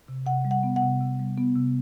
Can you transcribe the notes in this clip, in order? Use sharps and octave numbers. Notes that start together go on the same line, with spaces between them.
C3
C3 F#5
G3
F#5
B3
F#5
C3
C3
G3
B3
C3